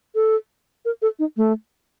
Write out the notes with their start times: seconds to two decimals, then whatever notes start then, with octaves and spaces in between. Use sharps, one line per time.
0.15 A4
0.85 A#4
1.02 A4
1.19 D#4
1.37 A3